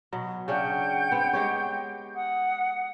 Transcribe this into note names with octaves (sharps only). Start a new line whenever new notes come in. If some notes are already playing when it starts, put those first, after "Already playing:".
B2 F#3
C#3 C#4 D4 F#5 G5 G6
B3 C4
G#3 G4 C#5
F#5 D#6